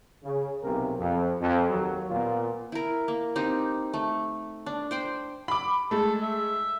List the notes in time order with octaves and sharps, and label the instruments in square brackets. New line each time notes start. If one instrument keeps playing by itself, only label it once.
[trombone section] C#3
B1 C3 A#3 C#4 A#4
F2
F2
D#2 F#3
A#2 B3 F4
[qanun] E4 A#4
A#3
C4 D#4 G4
A3
D4
C5 G5 C6
[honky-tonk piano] B5 D6
[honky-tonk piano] G#3 A3 [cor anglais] A4
[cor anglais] E5